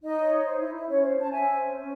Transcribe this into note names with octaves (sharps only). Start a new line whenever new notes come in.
D#4 D#5
C#5
D#4
C5
E4
E4
C#4 C#5
C5
C#4 A5
C#4 E5 G#5
C5
C#4
C#4